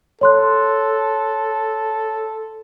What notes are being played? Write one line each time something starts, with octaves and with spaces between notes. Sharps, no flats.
A4 C#5 C6 F#6